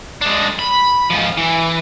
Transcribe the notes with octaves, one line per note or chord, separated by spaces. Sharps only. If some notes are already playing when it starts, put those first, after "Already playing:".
G#3 D4
B5
G#2 F3
E3